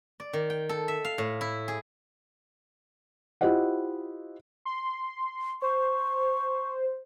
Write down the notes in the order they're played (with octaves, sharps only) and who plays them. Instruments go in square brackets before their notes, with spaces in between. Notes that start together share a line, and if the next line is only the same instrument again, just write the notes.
[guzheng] D5
D#3
G5
A4
E5
F5
A2
E4
G#4
[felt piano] E4 F4 G4 C5 D#5 F#5
[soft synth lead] C6
[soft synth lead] C5 [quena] C#6